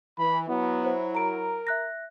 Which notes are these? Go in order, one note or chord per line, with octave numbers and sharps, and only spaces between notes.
E3 B5
F#3 B3 E4
F#4 C5
A#4 A#5 D7
E5 F#6 A#6